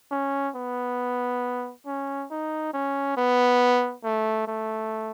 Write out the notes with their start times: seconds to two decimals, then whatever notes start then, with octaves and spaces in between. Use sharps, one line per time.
0.11 C#4
0.55 B3
1.86 C#4
2.30 D#4
2.74 C#4
3.17 B3
4.04 A3
4.48 A3